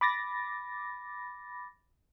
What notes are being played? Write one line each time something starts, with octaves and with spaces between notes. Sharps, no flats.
B5 D6 A6 A#6